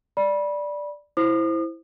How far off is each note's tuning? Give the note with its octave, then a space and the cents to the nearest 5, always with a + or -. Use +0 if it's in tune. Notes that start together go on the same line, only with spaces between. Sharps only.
D5 +0 B5 -25
E4 +0 C5 +0 D#6 -40